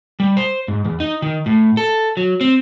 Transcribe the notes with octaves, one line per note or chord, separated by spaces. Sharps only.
G3
C5
G#2
E2
D#4
D#3
A2
A4
F#3
C4